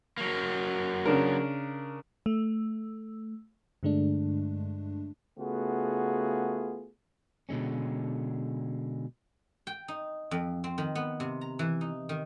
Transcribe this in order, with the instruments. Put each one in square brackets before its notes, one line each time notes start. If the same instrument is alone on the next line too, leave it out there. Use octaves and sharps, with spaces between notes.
[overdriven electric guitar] F#3 A#3
[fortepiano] C#3 D4 A#4
[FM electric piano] A3
G2 D3 G#3 A3 D4
[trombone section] C#3 A3 B3 F4 F#4 G#4
[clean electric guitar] B2 D3 G#3 C#4
[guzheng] G5
D#4
F2
C4
D#3
B3
C3
A#5
E3
D#4
D#3